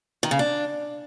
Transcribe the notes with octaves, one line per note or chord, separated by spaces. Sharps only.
D#3
C#3
D4